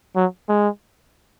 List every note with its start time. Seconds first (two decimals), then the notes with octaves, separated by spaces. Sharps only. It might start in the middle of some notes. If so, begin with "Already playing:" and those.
0.16 F#3
0.49 G#3